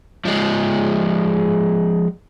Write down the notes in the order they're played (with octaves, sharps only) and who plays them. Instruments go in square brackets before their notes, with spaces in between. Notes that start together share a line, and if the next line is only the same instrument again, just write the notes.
[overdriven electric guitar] F3 G#3